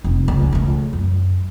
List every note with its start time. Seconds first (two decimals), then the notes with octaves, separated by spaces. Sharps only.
0.04 F1
0.28 C#2
0.53 C#2 A3
0.93 F#2